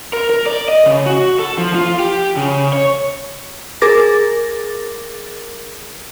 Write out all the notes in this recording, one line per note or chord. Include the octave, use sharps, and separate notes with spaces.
A#4
A#4
D5
D#5
C#3
F#4
A4
F3
F4
G4
C#3
C#5
G#4 A#4 D6 A6 A#6